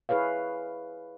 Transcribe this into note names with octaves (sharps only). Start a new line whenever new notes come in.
E4 G#4 B4 C#5 F5